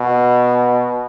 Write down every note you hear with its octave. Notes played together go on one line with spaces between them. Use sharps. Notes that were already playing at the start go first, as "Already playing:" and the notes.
Already playing: B2